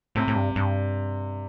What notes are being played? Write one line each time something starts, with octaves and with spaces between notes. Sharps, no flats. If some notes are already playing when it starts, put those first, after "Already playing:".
A2 C3
A2
G2
G2